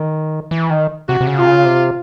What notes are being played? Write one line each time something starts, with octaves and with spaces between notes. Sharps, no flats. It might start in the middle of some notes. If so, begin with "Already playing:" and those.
Already playing: D#3
E3
D#3
C3 F#4
C3
C#3
C3 F4
C#3
C3